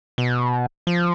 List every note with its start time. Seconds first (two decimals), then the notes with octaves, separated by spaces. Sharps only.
0.18 B2
0.87 F3